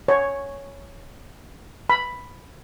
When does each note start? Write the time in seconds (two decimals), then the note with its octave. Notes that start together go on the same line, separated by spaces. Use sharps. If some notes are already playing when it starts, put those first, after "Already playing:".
0.08 C#5
1.90 B5